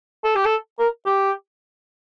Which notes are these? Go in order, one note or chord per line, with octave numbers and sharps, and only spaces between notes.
A4
G4
A4
A#4
G4